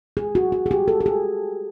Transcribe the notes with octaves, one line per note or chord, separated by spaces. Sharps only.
G#4
F#4
F#4
G#4
G4
A4
A4
G#4